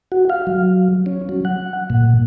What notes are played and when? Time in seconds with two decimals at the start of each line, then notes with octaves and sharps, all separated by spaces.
0.12 F#4
0.30 F5
0.47 F#3
1.06 C#4
1.29 F#3
1.45 F#5
1.90 A#2